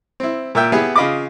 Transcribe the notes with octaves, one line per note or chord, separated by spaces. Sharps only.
C4 E4
A#2 A#4 E5 G5
B3 E4 G4 G#4 B4
C#3 F4 D#5 B5 D6